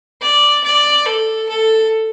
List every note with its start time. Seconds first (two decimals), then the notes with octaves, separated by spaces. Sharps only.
0.21 D5
0.64 D5
1.06 A4
1.49 A4